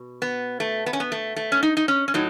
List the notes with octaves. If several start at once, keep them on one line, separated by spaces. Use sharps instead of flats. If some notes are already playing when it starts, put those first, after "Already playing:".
Already playing: B2
B3
A3
B3
C#4
B3
A3
A3
C#4
D#4
D#4
C#4
C#4
A2 F#3 D#4